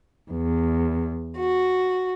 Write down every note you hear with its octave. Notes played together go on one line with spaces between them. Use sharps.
E2
F#4